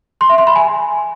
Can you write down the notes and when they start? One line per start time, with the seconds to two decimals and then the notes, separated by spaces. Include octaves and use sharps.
0.21 C6
0.29 E5
0.38 C6
0.47 B5
0.56 G#5